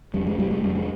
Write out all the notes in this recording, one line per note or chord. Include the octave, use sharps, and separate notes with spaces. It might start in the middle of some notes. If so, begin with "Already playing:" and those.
F2 G3
G#3
C3 G3
G#3
F2 G3
G#3